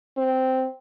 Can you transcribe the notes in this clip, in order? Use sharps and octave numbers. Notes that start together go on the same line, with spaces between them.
C4